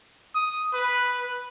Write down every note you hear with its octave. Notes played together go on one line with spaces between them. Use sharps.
D#6
B4